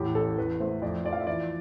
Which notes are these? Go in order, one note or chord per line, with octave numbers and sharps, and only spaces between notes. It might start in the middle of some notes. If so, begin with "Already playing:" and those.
Already playing: E2 A2 G4
A1 A4
E2 B4
A3 C5
F2 D5
F3 D5
F5
E5
E3 D5